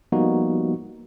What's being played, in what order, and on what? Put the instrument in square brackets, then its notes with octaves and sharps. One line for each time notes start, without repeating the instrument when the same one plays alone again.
[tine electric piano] F3 G3 A#3 B3 D#4 F#4